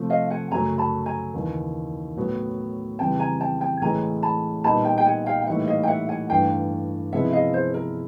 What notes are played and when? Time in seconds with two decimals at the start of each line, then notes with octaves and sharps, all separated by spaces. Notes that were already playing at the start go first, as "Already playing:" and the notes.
Already playing: C3 F3 A3
0.10 D#5 F5
0.30 F#5 G#5
0.51 F#2 C#3 F#3 A3 G#5 A#5
0.78 A5 B5
1.06 G#5 A#5
1.34 D#2 C#3 E3
2.17 A2 F#3 B3
2.99 F2 C#3 E3 G3 G5 A5
3.19 G#5 A#5
3.40 G5 A5
3.61 G5 A5
3.82 A2 E3 G#3 C#4 G#5 A#5
4.23 A5 B5
4.64 A#2 G3 B3 D#4 A5 B5
4.85 G5 A5
4.98 G5
5.06 F#5 G#5
5.26 F5 G5
5.41 G5
5.47 A2 E3 G3 A#3 D#4 E5 F#5
5.68 D#5 F5
5.83 G5
5.88 E5 F#5
6.09 F#5 G#5
6.29 G2 E3 A3 D4 F5 G5
7.12 C3 F3 G#3 B3 E4 E5 F#5
7.33 D#5 F5
7.54 C5
7.74 A#4